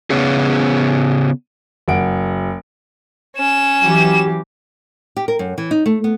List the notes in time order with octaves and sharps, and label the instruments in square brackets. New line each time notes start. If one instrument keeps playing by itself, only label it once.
[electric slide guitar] C#3 B3 C#4 G#4
[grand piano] F#1 F#5 D7
[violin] C#4 E7
[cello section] E3 F#3 G4
[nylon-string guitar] G4
A#4
F#2
E3
D#4
A3
B3